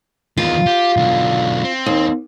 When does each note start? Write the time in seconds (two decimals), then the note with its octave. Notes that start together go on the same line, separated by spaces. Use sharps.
0.37 E2 D#3 F4
0.67 G4
0.97 B1 D3
1.64 C4
1.86 D#2